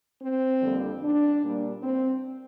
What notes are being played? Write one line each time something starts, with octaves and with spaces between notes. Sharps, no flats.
C4 C5
F2 D3 G3 A#3 D4
D4 D5
A#2 G3 A#3 D4
C4 C5